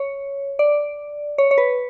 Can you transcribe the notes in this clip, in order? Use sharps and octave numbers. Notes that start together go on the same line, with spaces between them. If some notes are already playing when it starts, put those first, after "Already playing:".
Already playing: C#5
D5
C#5
C#5
B4